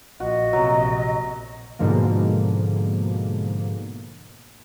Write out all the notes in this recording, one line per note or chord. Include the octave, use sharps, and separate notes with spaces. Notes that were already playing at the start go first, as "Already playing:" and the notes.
A#1 F#4 D#5
A#1 C3 F#3
G#2 B2 D3 F3 A#3